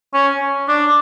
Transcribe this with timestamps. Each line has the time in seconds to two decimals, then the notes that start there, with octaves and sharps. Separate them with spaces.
0.14 C#4
0.68 D4